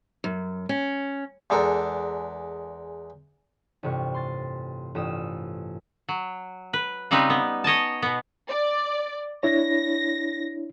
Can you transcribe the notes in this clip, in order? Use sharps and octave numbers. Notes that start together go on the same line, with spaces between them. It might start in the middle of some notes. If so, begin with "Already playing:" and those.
F#2
C#4
E2 G#3 D4 A4 A#4
A1 G2 C3 F4 C#6
C6 A6
A1 G2 F4 D#6 E6 E7
F#3
B4
C#3 G3 C4 D#4 B4
B3
C#5 D#5 G#5 A5
B2 B3
D5
D4 E4 C#5 A#6